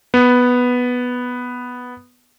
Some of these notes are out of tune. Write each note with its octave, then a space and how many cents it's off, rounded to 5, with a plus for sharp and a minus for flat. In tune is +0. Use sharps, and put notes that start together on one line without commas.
B3 +0